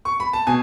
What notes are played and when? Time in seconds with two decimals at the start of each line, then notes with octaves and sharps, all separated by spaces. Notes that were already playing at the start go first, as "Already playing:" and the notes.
0.05 C#6
0.20 B5
0.33 A5
0.47 B2 G#5